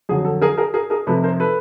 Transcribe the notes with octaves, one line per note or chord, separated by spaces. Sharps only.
F2 D3 F#3 G#4
A4
G#4 A#4
G#4 A#4
G#4 A#4
G#4 A#4
F1 F2 C3 A4 B4
A#4 C5
A4 B4